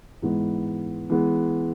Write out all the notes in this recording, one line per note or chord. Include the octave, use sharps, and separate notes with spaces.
G#2 E3 G#3 B3
E3 G#3 B3